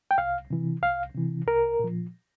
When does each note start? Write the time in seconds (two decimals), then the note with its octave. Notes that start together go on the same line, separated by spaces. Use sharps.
0.11 G5
0.18 C2 F5
0.50 C3 E3
0.83 C2 F5
1.15 C3 E3
1.47 C2 A#4
1.79 A#2 F3